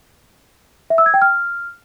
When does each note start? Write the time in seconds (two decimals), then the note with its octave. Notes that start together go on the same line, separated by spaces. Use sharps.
0.90 E5
0.98 E6
1.06 G#6
1.14 G5
1.22 F6